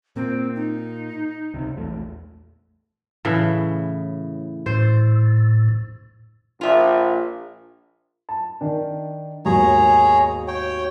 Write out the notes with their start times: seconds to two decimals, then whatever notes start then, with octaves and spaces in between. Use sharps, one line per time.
0.16 A#2 A#3 C4
0.55 D#4
1.54 C#2 C3
1.76 A#1 E2 A3
3.25 A2 C#3 E3
4.66 A2 C5
6.61 A#1 F4 E5
8.29 A5
8.61 D#3 D4
9.45 D#2 G#2 B2 G#4 C#5 A#5
10.48 C#5 G5